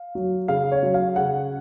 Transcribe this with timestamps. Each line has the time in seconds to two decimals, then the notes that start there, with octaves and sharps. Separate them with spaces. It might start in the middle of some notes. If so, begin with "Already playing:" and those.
Already playing: F5
0.15 F#3
0.48 C#3 F5
0.72 C#5
0.83 F#3
0.94 F5
1.16 C#3 F#5